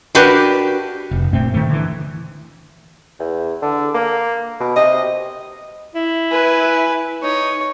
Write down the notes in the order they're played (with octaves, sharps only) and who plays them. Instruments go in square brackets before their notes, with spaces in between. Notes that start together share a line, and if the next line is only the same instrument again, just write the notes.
[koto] D4 F#4 G4 A#4 B4
[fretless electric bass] F1
G2 A#2 A3 C4
D#3 A3
D3 E3
[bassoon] E2
D3
A#3
B2
[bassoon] C3 [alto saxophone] D#5
[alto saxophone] E4
[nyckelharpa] B4 G#5
[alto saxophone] D#4 [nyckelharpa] C#5